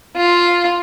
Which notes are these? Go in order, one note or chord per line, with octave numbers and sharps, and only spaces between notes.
F4